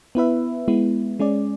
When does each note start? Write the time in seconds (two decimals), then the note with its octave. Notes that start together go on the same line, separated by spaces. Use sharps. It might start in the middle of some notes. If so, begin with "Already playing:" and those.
0.15 B3 E4 B4 E5
0.68 G#3 B3 E4
1.20 G#3 C#4 G#4 D5